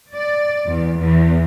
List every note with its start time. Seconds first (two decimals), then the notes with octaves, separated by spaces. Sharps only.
0.12 D5
0.66 E2
0.97 E2